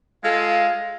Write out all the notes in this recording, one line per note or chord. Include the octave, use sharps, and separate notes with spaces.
G#3 F4 A4 F5